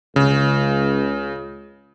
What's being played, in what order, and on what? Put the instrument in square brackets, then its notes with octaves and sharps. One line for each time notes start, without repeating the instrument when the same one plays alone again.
[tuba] C#2 [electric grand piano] C#3